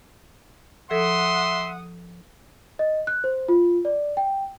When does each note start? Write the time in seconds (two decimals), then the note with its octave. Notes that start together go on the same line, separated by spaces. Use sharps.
0.91 F3 A4 E5 F#5 C6 D#6
2.79 D#5
3.07 F#6
3.24 C5
3.49 F4
3.85 D5
4.17 G5